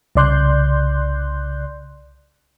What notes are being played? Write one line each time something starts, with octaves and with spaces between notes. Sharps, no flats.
C2 C#3 D5 C6 F#6 G6